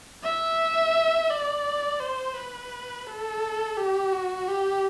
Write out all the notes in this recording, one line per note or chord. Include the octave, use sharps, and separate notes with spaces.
E5
D5
C5
B4
A4
G4
F#4
G4